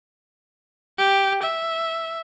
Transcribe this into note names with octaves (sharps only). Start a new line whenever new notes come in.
G4
E5